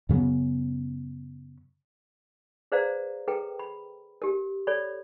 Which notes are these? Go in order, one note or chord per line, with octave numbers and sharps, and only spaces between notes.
F#2 C#3 F#3 B3
G#4 B4 C5 D5 F5 A#5
G#4 A4 B4 G5 A#5
B5
G4 A#4
A4 C#5 D5 B5